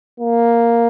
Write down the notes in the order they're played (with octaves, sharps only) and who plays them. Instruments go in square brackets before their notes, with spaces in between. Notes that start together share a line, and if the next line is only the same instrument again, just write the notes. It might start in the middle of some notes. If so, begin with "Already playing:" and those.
[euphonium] A#3